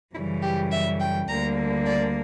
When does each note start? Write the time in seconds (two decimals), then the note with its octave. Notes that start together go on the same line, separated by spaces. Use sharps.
0.14 F#2 C#3 E3 G3 E4
0.43 G4
0.72 E5
1.00 G5
1.28 D2 D3 G3 A#3 A#5
1.86 D5